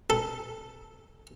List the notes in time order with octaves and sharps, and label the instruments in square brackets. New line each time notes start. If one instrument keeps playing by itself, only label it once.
[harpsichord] A4